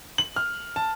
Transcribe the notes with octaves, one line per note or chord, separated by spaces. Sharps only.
F#7
F6
A5